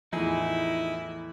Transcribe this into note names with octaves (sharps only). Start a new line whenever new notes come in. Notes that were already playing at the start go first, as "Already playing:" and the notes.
E2 A2 E3 F3 D#4 E4 G#4